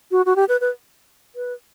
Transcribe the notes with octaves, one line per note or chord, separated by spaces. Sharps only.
F#4
F#4
G4
B4
B4
B4